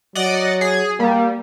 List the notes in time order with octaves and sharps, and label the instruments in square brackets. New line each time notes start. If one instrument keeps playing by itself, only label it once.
[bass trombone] F#3 [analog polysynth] D5 D#5 F#5
[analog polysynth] G#4
[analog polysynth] G3 [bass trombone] A#3